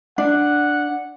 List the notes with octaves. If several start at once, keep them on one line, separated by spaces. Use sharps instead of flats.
D4 F#5